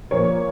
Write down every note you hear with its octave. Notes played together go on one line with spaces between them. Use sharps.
A#2 F3 A#3 C#5